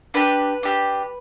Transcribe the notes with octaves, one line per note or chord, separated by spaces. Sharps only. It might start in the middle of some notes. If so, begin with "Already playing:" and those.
D4 G4 B4
D4 G4